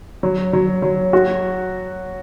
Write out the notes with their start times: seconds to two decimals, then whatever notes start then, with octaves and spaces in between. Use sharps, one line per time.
0.23 F#3
0.53 F#3
0.82 F#3
1.13 F#4